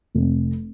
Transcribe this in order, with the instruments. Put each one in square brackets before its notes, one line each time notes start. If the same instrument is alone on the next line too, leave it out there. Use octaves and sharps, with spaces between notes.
[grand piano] F1